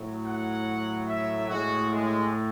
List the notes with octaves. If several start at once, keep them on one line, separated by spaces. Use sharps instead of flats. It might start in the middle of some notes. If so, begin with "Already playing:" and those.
Already playing: A2 F#3
F#5
E5
A2 G#3 F#4
G#3